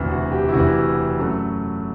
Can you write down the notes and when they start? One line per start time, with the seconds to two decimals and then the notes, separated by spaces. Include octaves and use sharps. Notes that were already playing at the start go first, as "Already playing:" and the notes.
Already playing: E1 D2 C3 E3
0.10 F#4
0.32 G4
0.48 E4
0.53 E1 D2 C3 E3 F#4
1.18 F#2 F#3 A3